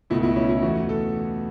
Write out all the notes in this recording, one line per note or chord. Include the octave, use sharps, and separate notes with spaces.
C#2 B2 A3 E4
E4
C#4
E4
E2 E3 A3 F#4
A4